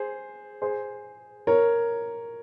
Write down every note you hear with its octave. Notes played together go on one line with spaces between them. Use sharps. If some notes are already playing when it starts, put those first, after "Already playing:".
Already playing: G#4 C5
G#4 C5
A#4 C#5